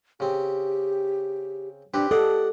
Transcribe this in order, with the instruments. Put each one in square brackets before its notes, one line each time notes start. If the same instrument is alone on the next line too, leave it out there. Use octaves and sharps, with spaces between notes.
[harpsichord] C#3 C4 [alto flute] G4
[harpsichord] C4 G4 B4 [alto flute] D4
[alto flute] G4 [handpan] A4 [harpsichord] D5 D#5 F#5